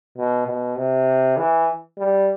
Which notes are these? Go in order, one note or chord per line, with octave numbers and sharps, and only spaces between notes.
B2
B2
C3
E3
G3